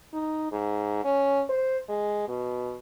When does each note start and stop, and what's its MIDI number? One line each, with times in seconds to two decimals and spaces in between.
0.13 0.49 63
0.52 1.00 44
1.04 1.42 61
1.49 1.78 72
1.89 2.25 56
2.28 2.77 47